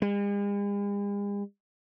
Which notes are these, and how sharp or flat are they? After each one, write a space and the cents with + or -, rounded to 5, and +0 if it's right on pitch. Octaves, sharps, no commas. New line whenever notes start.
G#3 -45